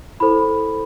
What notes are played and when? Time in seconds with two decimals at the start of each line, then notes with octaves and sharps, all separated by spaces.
0.20 E4 A4 C5 B5